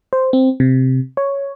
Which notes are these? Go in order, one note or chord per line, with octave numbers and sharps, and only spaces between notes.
C5
C4
C3
C#5